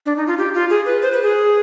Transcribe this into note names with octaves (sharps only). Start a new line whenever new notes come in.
D4
D#4
F4
G4
F4
G#4
B4
C5
B4
G#4